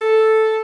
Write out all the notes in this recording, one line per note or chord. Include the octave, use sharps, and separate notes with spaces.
A4